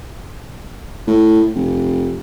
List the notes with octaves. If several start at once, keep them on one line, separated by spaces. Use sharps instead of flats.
A2
F1